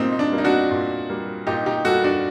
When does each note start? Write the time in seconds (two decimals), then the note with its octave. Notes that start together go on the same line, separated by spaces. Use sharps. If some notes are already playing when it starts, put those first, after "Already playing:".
Already playing: A#2 G3 A#3 C4 D#4
0.12 D#4
0.19 D4
0.32 G3 A#3
0.38 D#4
0.44 D4 F#4
0.71 A#2
1.09 G3 A#3
1.47 A#2 D#4 G4
1.66 D#4 G4
1.85 G3 A#3 F#4 A4
2.04 D4 F#4